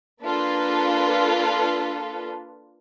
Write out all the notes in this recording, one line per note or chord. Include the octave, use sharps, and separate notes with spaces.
A#3 D4 F4 A4 B4